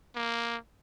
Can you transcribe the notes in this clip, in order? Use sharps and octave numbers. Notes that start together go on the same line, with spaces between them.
A#3